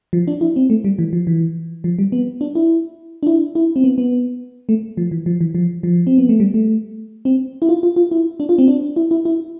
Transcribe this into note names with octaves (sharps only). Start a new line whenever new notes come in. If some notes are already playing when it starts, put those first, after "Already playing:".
F3
D4
E4
C4
A3
G3
E3
F3
E3
F3
G3
B3
D4
E4
D4
E4
E4
C4
B3
B3
A3
F3
E3
F3
E3
F3
F3
C4
B3
A3
G3
A3
C4
E4
F4
F4
F4
E4
D4
F4
C4
D4
E4
E4
E4